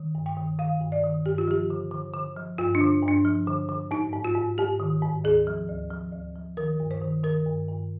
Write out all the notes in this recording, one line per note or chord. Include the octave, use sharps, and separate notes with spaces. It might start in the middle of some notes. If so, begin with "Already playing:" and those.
Already playing: D#3
G2
G5
D#3
D#3 F5
G2
D5
D#3
G2 G4
F4
F3 G4
D3
D3
D3
F3
G2 F4
D4
D3
G2
D4
F3
D3
D3
G#2 D#4
G#2
F4
G#2
G#2 G4
D#3
G#2
D2 G#4
F3
D2
F3
D2
F3
D#3 A#4
G2
C5
D#3
D#3 A#4
G2
G2